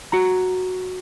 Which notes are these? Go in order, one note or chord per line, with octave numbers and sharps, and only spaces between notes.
F#4 A#5